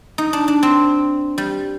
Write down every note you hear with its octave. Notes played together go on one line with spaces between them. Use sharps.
D#4
D4
D4
C4
G3